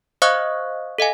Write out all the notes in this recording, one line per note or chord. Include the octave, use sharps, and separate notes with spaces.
C5 D#5 F5 C#6 D#6 F#6
A4 D#5 F5 G#5